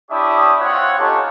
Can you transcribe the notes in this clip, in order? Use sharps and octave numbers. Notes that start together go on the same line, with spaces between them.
D4 E4 G4 C#5 E5 D#6
C4 F4 C#5 F#5
C#4 D#4 F4 G4 A4 C#5